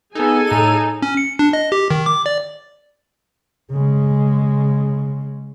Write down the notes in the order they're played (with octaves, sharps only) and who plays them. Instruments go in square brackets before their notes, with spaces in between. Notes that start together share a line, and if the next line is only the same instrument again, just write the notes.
[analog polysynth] B3 D#4 [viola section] G#4 A4 G#5
[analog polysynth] A2 D#7 [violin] D#4
[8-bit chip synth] C#4
C#7
D4
D#5
G4
D#3
D6
D5
[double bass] C#3 G#3